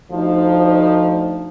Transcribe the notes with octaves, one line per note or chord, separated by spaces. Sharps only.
D2 F3 D#4